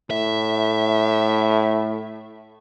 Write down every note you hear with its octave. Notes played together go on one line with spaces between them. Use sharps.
A2 E5